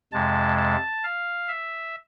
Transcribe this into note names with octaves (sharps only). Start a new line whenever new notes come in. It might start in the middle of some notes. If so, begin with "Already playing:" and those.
F2 C3 G#3 A5
A5
F5
E5